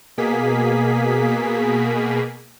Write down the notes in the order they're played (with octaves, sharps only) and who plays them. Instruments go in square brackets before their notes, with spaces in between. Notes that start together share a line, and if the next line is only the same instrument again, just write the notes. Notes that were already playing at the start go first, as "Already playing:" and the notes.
[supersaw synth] B2 A#3 G#4 B6